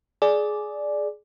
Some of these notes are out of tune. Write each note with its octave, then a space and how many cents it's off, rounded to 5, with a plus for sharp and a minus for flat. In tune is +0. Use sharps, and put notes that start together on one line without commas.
G#4 +15 D5 +0